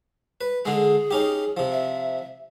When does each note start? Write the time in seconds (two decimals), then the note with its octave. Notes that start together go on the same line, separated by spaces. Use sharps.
0.41 B4
0.65 D3 G#3 G#4
1.11 C#4 D#4 G4
1.57 C3 F3
1.72 E5